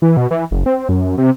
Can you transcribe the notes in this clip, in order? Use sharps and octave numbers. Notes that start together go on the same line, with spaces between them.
E3
B2
E3
F#1
C4
F#2
C3